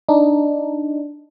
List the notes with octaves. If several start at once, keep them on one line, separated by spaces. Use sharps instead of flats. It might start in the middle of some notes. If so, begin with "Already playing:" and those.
D4 D#4